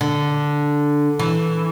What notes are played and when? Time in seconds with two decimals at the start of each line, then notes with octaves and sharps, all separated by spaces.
0.01 D3
1.19 E3